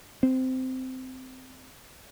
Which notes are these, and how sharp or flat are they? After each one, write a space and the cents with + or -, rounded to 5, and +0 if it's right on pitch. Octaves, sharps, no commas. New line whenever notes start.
C4 -15